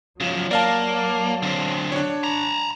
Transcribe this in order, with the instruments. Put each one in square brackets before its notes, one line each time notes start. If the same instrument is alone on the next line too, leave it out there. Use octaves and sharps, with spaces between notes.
[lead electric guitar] C#3 F3 [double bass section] F#3
[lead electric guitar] A#3 [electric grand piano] D5 F5 A5
[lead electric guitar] D3 C4
[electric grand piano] D4 C#5
[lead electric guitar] A#5 B5